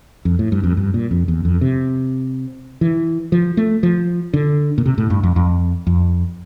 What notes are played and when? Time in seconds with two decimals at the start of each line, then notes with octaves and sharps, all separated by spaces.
0.25 F2
0.39 A2
0.52 G2
0.64 F2
0.77 G2
0.94 A#2
1.11 F2
1.28 E2
1.45 F2
1.61 C3
2.81 E3
3.32 F3
3.57 A3
3.83 F3
4.33 D3
4.78 A#2
4.86 C3
4.98 A2
5.10 G2
5.23 F2
5.36 F2
5.87 F2